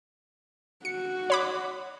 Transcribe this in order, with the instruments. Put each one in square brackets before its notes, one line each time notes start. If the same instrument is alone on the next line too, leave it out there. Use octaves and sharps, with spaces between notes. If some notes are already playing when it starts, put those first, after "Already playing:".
[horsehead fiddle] F#4 [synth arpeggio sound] C#7
[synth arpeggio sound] C#5 B5 D6